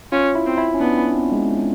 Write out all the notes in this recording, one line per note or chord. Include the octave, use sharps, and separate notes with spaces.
C#4 F4
E4
C4
E4
C#4
B3 D4
C#4
B3
C4
G#3